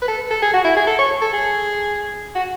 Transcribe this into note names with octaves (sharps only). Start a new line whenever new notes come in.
B4
A4
A4
G#4
F#4
E4
G#4
A4
C#5
A4
G#4
F#4